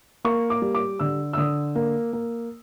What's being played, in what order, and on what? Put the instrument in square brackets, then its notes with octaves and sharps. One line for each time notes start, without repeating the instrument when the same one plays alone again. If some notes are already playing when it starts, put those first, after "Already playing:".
[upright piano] A#3 C#6
D6
G3
D6
D3 E6
E6
D3 D#6
A#3
A#3